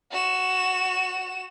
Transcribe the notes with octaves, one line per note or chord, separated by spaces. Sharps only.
F#4 E7